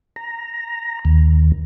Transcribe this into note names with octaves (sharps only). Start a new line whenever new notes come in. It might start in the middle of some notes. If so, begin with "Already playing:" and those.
A#5
D#2